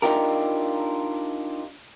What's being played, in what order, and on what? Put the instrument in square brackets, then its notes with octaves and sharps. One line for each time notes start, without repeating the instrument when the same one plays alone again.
[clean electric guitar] D4 D#4 F4 G4 A#4